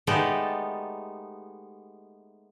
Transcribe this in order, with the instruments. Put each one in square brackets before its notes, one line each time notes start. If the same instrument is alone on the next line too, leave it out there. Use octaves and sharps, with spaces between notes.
[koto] G#3 A3 B3 D#4 G4 D5